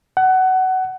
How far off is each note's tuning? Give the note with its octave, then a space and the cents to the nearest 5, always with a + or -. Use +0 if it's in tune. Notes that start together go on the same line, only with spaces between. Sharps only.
F#5 +20